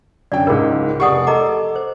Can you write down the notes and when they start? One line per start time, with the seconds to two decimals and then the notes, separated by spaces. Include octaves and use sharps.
0.32 F#2 D3 D5 G5
0.47 C#2 G#2 G#4 A#4
1.00 F1 G4 D5 F#5 C#6 D#6
1.27 A4 D#5 A#5 D6
1.76 C5